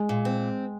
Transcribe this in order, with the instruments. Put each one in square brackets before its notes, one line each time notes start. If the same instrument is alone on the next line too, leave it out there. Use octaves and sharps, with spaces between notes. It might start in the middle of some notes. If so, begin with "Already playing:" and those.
Already playing: [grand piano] G#3
[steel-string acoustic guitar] A#2
C4